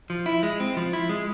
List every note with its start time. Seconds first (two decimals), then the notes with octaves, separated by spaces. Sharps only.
0.10 F3
0.26 E4
0.43 G#3
0.60 C4
0.77 F3
0.93 E4
1.09 G#3